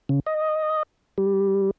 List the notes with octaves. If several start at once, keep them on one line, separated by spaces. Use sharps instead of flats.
C#3
D#5
G3